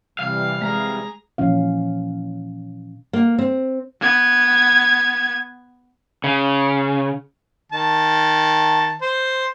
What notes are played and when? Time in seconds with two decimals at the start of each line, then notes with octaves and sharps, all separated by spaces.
0.19 C3 E3 G3 F5
0.62 G#3 G#4 A#5
1.38 A#2 E3 F3 C#4 F5
3.13 A#3
3.38 C4
4.01 B3 G#6
6.24 C#3
7.72 D#3 A5
9.01 C5